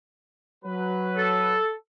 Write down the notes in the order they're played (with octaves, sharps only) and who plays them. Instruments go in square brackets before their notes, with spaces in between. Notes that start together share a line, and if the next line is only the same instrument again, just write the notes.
[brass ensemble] F#3 B4
[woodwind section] A4